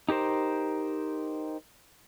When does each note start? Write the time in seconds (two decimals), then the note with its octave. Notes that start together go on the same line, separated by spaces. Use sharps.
0.09 D#4 G4 A#4 C5